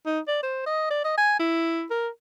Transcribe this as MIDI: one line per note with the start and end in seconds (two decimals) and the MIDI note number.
0.06 0.19 63
0.27 0.42 74
0.43 0.63 72
0.66 0.88 75
0.90 1.02 74
1.04 1.15 75
1.18 1.37 80
1.39 1.85 64
1.90 2.08 70